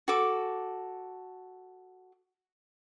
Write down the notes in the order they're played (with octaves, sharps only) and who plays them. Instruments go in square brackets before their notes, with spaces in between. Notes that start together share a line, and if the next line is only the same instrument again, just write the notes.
[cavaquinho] F#4 A4 D6